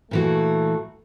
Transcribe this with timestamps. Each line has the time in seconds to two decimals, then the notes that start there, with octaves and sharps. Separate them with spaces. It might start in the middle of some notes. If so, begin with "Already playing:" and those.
0.11 A#2 E3 A3 F#4